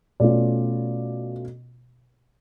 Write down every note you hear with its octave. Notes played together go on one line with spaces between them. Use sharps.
B2 A3 C#4 F4 D5